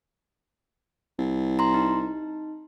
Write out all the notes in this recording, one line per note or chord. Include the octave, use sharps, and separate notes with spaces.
C2
A#5 C6
D#4